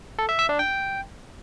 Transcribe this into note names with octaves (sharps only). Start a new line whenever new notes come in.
A4
E5
E5
D4
G5